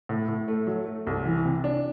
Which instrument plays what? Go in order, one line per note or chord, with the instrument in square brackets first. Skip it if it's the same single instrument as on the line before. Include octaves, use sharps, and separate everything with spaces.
[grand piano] A2
A2
A3
F#3
A3
C2
E3
C3
D4